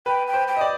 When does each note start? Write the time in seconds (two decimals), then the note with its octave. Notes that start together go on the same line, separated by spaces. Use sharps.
0.06 B4 G5
0.27 G5
0.34 C5
0.48 G5
0.57 D#5
0.61 D5